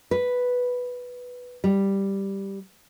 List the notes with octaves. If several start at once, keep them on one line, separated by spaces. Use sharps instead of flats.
B4
G3